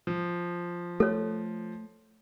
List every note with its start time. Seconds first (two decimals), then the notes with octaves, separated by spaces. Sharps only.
0.07 F3
1.00 A3 A4 C#5